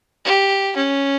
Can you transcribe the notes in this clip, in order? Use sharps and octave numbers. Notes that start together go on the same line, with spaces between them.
G4
C#4